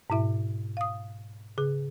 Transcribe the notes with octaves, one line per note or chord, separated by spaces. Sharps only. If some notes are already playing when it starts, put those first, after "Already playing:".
G#2 B2 E4 E5
F5 D#6
C#3 G#4